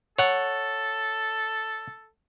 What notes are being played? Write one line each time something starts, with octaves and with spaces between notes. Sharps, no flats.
A4 C#5 F#5